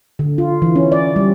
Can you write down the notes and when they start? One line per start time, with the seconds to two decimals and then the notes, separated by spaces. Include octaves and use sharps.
0.19 D3
0.38 F4
0.62 E3
0.76 C#4
0.92 D5
1.16 G3